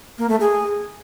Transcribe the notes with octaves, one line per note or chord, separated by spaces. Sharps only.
A#3
A3
G#4